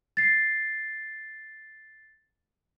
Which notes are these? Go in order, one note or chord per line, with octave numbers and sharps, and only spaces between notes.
A6 C7